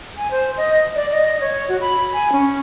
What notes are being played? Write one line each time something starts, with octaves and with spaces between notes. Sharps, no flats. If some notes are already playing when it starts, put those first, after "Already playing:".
G#5
C5
D#5
D5
D#5
C#5
F#4
B5
G#5
C#4